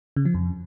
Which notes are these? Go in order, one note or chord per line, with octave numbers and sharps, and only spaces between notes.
C#3
F3
F2